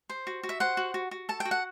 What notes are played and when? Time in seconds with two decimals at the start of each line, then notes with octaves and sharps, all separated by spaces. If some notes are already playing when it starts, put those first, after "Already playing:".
0.09 C5
0.27 F#4
0.43 F#4
0.49 E5
0.60 C5 F#5
0.77 F#4
0.94 F#4
1.11 F#4
1.29 A4 A5
1.40 G5
1.45 F#4
1.51 F#5